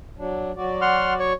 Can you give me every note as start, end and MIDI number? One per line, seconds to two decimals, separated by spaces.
0.17 0.52 54
0.17 0.52 62
0.56 1.32 54
0.56 1.32 66
0.56 1.32 74
0.82 1.13 78
0.82 1.13 84
0.82 1.13 89
1.19 1.33 73